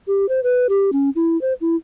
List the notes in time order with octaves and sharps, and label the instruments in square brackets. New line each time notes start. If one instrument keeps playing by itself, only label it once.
[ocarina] G4
C5
B4
G4
C#4
E4
C5
E4